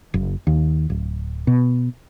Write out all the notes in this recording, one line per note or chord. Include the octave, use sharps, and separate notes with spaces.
F#1
D#2
D1
B2